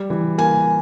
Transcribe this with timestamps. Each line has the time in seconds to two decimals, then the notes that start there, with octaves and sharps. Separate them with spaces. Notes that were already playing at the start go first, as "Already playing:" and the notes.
Already playing: G3
0.10 E3
0.38 A#3 G#5